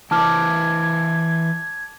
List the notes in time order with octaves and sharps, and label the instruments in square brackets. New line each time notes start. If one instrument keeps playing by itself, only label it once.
[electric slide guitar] E3 E4 C5 [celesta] A5 D6 F6 [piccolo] G#6